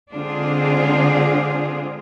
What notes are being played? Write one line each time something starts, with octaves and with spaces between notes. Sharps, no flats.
D3 G#3 C4 D4 F4 G#4